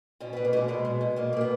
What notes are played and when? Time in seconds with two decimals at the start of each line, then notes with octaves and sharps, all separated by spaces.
0.20 B2 C#4
0.33 B2 B3
0.45 A#3
0.53 B2 G#3
0.68 B2 G#3
0.85 B2
1.01 B2
1.16 B2 A#3
1.33 B2 A#3
1.41 B3